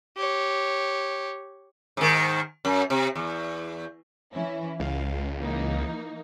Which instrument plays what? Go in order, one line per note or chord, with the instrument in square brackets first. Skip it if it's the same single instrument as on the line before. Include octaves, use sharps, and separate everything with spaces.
[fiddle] G4 C#5
[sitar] G#2 D#3
F#2
C3
E2
[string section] E3 C#4 E4
[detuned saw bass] C#2 [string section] F5
[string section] E3 A#3 D#4